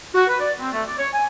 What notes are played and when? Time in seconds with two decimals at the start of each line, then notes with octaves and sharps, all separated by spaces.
0.14 F#4
0.27 B4
0.40 D5
0.59 C4
0.72 A3
0.86 D5
0.98 C#5
1.13 G#5